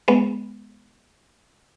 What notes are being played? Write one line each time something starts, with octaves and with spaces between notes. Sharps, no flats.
G#3 B3